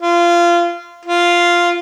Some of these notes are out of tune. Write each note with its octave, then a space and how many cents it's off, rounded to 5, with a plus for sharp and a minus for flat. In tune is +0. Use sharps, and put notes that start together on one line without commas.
F4 -20
F4 -5